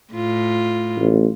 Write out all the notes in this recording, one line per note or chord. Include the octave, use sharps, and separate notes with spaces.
A2 F4
A1